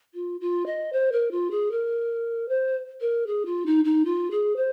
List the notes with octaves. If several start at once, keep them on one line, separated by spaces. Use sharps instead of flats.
F4
F4
D#5
C5
A#4
F4
G#4
A#4
C5
A#4
G#4
F4
D#4
D#4
F4
G#4
C5